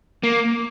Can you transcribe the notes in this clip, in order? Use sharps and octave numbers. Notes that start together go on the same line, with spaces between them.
A#3